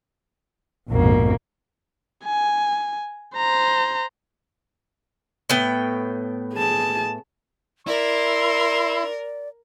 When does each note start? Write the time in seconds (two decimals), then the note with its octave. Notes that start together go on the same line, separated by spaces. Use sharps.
0.90 A#1 F2 G#2 B2 A#3
2.25 G#5
3.37 C5 A#5
5.50 A2 B3 G5
6.55 G#4 A5
7.87 E4 A#4 D5 C6